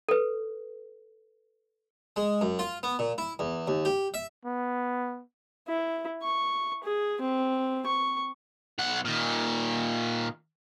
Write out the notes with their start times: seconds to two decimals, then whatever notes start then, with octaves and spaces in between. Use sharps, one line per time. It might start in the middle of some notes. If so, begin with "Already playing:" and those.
0.09 A4 B4
2.16 G#3
2.41 F#2
2.59 F4
2.83 B3
2.99 A#2
3.18 E4
3.39 E2
3.68 D#2
3.85 G4
4.14 E5
4.45 B3
5.68 E4
6.23 C#6
6.84 G#4
7.21 C4
7.86 C#6
8.79 B1 F#5
9.05 A#2 D#3